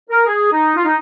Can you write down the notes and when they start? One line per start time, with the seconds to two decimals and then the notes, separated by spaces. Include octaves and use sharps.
0.10 A#4
0.26 G#4
0.52 D#4
0.76 F4
0.85 D#4